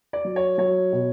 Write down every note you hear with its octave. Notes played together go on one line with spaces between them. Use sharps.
D5
F#3
C#5
F#3 C#5
B2